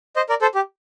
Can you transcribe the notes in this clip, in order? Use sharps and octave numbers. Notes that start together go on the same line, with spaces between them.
C5 D#5
A#4 D5
A4 C5
G4